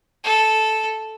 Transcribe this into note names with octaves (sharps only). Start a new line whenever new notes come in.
A4